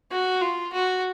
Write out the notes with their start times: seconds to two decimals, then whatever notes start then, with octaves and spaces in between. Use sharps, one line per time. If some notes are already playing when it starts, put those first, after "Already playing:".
0.11 F#4
0.41 F4
0.73 F#4